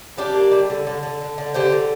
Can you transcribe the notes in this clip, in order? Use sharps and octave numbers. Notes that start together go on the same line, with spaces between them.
G3 D4 G4
A#3
G3
D3
D3
D3
D3
D3
D3 G4 C5
D3